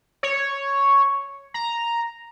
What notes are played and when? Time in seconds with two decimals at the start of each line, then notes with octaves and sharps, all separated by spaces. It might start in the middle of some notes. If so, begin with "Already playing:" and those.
0.23 C#5
1.54 A#5